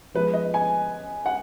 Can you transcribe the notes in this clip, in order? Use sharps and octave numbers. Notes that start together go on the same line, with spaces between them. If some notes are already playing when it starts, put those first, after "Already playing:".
F3 G#3 B3 B4
D#5
G#5
F#5